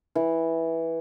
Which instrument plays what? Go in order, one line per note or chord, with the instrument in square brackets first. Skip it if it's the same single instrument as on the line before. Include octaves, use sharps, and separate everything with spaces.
[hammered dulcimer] E3